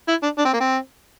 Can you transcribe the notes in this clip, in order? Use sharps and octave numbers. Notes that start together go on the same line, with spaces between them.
E4
D4
D4
C4
A#3
C4